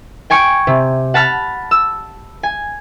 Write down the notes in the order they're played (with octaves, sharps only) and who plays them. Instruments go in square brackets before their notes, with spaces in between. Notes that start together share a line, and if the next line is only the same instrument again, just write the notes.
[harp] G5 G#5 C#6 D7
C3
F#5 A5 B5 F6
E6
G#5